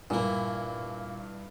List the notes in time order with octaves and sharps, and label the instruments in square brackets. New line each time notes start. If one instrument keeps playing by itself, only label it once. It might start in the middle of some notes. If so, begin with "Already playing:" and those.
[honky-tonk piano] G2 [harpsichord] A#2 A#3 [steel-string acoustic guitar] E4 G5 G#5